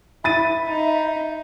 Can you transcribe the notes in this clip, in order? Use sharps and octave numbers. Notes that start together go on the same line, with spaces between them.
E5 B5 A6 D#7
D#4